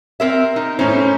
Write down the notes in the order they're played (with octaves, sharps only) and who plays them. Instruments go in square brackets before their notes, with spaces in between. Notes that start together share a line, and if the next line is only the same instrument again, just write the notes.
[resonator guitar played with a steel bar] C4 A#4 E5
D#4
[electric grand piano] A2 C#4 C5 [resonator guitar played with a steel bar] D#4